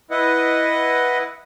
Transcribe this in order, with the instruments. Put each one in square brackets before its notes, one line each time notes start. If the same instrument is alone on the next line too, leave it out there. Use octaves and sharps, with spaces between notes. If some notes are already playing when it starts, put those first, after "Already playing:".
[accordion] E4 B4 D#5 F#5